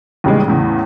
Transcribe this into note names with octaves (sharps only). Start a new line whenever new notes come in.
D#2 A2 C#3 E3 G3 G#3
E2 A2 C#3